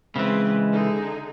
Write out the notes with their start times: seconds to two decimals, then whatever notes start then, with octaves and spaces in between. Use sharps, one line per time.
0.16 C#3 E3 G#3 C4 B4
0.71 D3 D#4 G#4